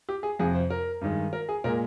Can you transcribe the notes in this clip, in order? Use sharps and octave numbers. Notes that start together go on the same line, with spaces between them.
G4
G#4
F2 C3 F3 G#4
C5
A#4
G2 D#3 G#3
A#4
G#4
A#2 G#3 A#4